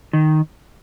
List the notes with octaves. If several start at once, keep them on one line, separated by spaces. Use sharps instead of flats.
D#3